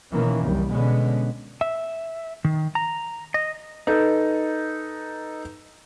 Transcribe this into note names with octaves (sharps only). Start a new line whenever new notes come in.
B2 D#3 E3 A#3 C#4
F#1 C2 G3
B2 D3 G#3 B3 C#4
E5
D#3
A#5
D#5
D#4 A4 B4